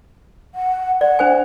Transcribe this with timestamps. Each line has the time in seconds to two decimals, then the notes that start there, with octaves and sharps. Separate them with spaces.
0.55 F#5
1.01 D5 F#5
1.19 D4 C5 G#5